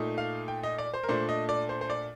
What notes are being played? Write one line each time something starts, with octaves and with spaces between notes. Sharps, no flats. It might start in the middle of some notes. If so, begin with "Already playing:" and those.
Already playing: A#2 A3 D#4
F5
G5
D#5
D5
C5
A#4
A#2 A3 D4 C5
D#5
D5
C5
C5
D5